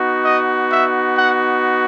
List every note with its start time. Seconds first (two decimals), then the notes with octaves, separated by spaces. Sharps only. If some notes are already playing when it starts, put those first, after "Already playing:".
Already playing: B3 D#4 F#4
0.25 D#5
0.71 E5
1.17 F#5